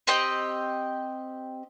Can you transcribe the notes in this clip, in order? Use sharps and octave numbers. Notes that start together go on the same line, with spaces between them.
C4 G4 D#5 G5